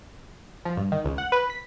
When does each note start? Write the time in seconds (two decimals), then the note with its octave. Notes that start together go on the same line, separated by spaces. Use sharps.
0.65 F3
0.77 G2
0.92 D#3
1.04 C#2
1.18 F#5
1.32 B4
1.50 B6